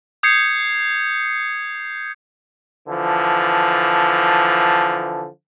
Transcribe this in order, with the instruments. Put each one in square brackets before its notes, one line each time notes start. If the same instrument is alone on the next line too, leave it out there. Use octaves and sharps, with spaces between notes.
[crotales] D#6 G6 G#6 C7 C#7
[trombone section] D3 E3 F3